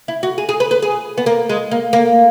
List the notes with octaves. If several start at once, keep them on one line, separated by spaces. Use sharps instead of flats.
E4
F#4
G#4
G#4
B4
B4
G#4
B3
A#3
G#3
A#3
A#3